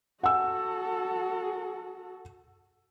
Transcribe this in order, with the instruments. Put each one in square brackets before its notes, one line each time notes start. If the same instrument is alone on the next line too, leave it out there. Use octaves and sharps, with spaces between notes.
[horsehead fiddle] F#4 A4 [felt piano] F#5 G#5 E6